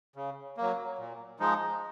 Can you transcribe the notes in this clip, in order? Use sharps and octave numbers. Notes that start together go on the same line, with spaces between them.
C#3
F#3 A#3
A#2
F3 G#3 D#4